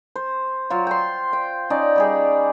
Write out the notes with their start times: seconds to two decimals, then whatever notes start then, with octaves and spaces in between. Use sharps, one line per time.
0.16 C5
0.70 F#3 F4
0.87 G5 C6
1.33 G5
1.70 C#4 D#4 D5
1.96 G3 G4 G#4